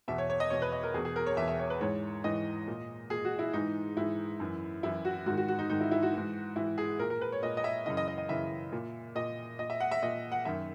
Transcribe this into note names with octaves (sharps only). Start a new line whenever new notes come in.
E2 B2 E5
C#5
C#5
D#5
E2 B2 C#5
B4
D#5
A#4
E2 B2 G#4
G#4
A#4
C#5
E2 B2 E5
E5
C#5
B4
G#2 E3 C#5
G#2 E3 D#5
A#2
A#2 G#4
F#4
E4
G#2 E3 D#4
G#2 E3 E4
F#2 E3
F#2 E3 E4
F#4
G#2 D#3 F#4
F#4
F#4
D#4
G#2 D#3 D#4
E4
E4
F#4
G#2 E3
G#2 E3 E4
G#4
A#2 A#4
A#4
B4
C#5
A#2 D#5
D#5
E5
F#2 C#3 E3 D#5
D#5
D#5
D#5
F#2 C#3 E3 E5
A#2
A#2 D#5
A#2 D#5
E5
F#5
E5
A#2 D#5
F#5
F#2 D#3 E5